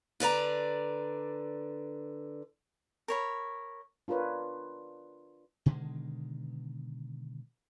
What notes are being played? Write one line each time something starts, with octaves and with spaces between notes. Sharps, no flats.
D3 B4 D5 A#5
A#4 C#5 B5
D4 F4 A#4 B4 C#5
B2 D3 D#3 G#3